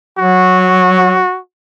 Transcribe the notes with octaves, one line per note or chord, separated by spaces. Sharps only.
F#3 F#4